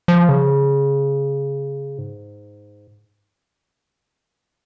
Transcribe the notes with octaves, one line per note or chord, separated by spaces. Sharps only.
F3
C#3
G#2